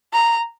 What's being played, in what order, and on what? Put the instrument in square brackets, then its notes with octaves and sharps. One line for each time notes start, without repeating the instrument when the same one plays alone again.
[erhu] A#5